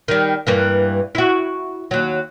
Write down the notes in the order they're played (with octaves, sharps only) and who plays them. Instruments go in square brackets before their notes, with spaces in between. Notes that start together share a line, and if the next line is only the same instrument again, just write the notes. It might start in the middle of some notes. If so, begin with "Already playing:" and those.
[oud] D#3 G3
G2 E3 A#3
E4 F#4
D#2 F#3